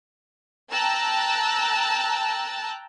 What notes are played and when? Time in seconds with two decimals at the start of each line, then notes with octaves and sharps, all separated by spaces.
0.71 G5 A5 A#5 E6 F#6